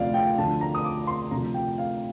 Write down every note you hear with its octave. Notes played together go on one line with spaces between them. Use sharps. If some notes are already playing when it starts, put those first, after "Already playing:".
Already playing: D2 C3 F3 D5 F5
G5
D2 D3 F3 A5
A#5
D#6
D6
C6
D2 C3 F3 A#5
G5
F5